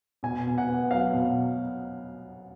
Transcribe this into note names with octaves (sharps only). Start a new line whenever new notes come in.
B2 G#5
B2
F#5
B3
F#3 F5
B2